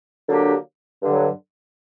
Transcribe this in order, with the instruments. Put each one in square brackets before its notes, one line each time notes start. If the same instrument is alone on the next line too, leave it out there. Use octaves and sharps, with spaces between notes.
[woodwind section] D3 F#3 A#3 D4 G4
G2 D3 F#3